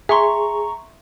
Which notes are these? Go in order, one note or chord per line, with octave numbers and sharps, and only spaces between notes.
G#4 E5 A#5 C6 C#6